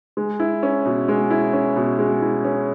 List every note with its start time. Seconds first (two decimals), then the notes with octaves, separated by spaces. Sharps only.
0.17 G#3
0.40 E4
0.63 C#4
0.85 B2
1.08 G#3
1.30 E4
1.53 C#4
1.76 B2
1.99 G#3
2.21 E4
2.44 C#4